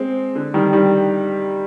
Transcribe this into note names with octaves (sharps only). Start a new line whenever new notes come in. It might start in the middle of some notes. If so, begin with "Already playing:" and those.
Already playing: G#3 C4
D3
D#3 G3
D#3 G3